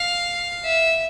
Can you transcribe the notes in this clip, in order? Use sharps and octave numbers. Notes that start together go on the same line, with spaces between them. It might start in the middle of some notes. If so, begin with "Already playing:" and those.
Already playing: F5
E5